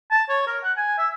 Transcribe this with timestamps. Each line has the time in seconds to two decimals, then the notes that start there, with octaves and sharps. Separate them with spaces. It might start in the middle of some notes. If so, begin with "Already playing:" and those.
0.11 A5
0.29 C#5
0.47 A#4
0.64 F#5
0.77 G#5
0.99 E5